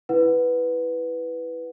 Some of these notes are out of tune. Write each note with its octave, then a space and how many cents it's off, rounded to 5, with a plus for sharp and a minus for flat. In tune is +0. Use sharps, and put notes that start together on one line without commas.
E4 +0 B4 +0 F#5 +0